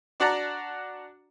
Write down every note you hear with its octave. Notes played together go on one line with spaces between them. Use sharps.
D4 F#4 D5 F#5 A5 A#5